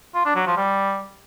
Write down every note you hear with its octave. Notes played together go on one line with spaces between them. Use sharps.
F4
D4
F#3
F3
G3